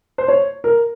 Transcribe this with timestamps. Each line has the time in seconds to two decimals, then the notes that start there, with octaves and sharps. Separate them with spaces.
0.18 C5
0.28 C#5
0.64 A#4